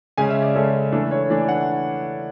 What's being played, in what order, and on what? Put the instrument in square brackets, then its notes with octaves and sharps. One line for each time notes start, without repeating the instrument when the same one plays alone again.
[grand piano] C#3 G#3 C#4 G#5
E5
D5
C#3 G#3 C#4 A4
E3 A3 D4 A4
C#5
E3 A3 D4 D5
F#5